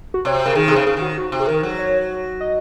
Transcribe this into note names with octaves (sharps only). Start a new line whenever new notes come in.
F#4
C3 C#5
C5
C#3 A#4
D#3 G#4
C3
G#4
C#3
C#3 G#4
D#3 F#4
F#4
C3
G#4
D#3 A#4
F#3
C#5
D#5